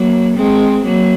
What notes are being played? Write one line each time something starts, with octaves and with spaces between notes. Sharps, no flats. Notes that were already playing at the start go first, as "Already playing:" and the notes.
Already playing: F#3 A#3
G#3 C4
F#3 A#3